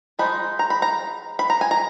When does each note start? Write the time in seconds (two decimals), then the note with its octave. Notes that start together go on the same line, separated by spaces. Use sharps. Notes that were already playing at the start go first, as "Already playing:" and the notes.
0.19 F3 G#3 D#4 B5
0.59 A#5
0.70 B5
0.82 A#5
1.39 B5
1.50 A#5
1.61 G#5
1.71 A#5